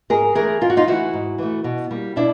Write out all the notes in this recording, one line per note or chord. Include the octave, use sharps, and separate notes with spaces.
G#2 G#4 A#4
E3 A3 G#4 A#4
G#2 F4
F#4
D#4 F4
E3 A3 E4 F#4
G#2
E3 A3
B2
G3 A#3
B2 D4 E4